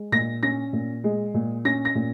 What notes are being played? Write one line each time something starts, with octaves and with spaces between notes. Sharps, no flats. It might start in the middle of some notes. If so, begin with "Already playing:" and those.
Already playing: G#3
A#2 A#6
C#4 A#6
A#2
G#3
A#2
C#4 A#6
A#6
A#2